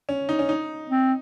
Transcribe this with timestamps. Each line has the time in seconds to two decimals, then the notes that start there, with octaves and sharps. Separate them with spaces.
0.09 C#4
0.29 D#4
0.39 C#4
0.49 D#4
0.90 C4